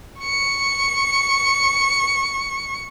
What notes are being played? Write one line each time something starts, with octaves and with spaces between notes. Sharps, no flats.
C#6 C#7